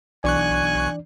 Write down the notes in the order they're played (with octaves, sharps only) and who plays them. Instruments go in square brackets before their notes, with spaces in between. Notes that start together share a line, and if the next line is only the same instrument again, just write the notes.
[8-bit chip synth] B1 C#6 F#6 [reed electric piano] E3 D4 D5 [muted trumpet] G#5